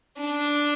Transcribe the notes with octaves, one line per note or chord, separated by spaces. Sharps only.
D4